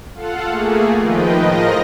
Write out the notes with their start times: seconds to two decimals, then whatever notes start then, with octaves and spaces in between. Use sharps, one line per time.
0.14 F4 A4 F5 F#5
0.45 A3 A#3 G#4
0.98 D#3 F3 B4 D#5 G5
1.39 A2 F3 A#4 D#5 A#6